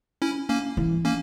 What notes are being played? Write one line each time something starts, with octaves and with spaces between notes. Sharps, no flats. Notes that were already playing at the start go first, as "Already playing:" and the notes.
C#4 E4
A#3 C#4
E3
A#3 C#4